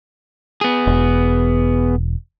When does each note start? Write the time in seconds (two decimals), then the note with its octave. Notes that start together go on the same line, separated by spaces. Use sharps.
0.61 B3 G#4
0.87 E1